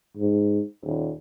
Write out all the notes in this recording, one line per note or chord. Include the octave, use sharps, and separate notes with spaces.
G#2
D#1